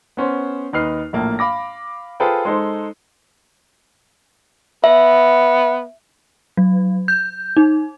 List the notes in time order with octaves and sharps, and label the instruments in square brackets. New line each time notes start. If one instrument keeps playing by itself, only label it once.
[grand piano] B3 C#4 C5
D#2 D#4 B4 F6 C7
A#1 A2 A#3
F5 B5 D6 A#6
F4 G#4 A4 B4 C5 G5
G#3 D#4 A4 C5
[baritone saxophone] B3 [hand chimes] E5
[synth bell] F#3
G6
D#4